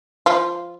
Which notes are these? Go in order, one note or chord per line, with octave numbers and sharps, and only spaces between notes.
F3 F4